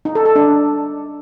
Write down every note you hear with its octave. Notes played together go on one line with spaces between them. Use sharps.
D#4
A4
A4
D4